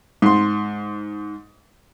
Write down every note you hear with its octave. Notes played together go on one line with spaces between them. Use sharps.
G#2 C6